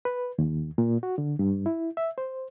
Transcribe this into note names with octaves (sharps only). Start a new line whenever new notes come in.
B4
D#2
A#2
F#4
D3
G2
E4
E5
C5